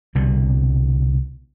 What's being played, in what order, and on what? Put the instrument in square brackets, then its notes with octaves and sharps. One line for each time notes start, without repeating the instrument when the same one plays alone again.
[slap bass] C2 B2 D3 G3